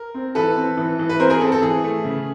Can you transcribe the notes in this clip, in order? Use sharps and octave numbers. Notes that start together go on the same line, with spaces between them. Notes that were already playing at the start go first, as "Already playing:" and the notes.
Already playing: A#4
C4
E3 A4 B4
C4
E3
E3
B4
C4 A#4 C5
G#4 A#4
C4 A4
A4
E3 G#4
A3
C#3